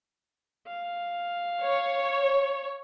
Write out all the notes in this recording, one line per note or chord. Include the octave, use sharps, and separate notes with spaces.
F5
C#5